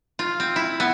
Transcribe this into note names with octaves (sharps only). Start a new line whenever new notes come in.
F4
C4
E4
B3